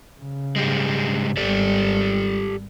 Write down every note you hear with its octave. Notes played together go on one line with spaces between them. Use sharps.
C#3
G#2 G3 G#3
G#1 G3 G4 A4 D5